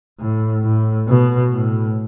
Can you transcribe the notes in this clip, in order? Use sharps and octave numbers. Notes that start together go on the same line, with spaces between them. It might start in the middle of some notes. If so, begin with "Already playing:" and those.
A2
A2
B2
A2